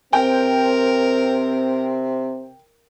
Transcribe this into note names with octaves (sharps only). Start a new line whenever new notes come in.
C3 C4 A#4 G5